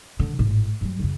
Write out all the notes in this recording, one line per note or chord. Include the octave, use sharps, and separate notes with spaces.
D3
G#1 A2
G2 F#3
F#2 C#3